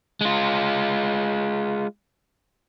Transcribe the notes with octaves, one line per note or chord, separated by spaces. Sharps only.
G#3 F4